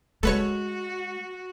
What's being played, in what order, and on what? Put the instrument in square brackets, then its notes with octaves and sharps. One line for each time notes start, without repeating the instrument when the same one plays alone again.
[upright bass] G#3 [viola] F#4 [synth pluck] A4 B4 C#5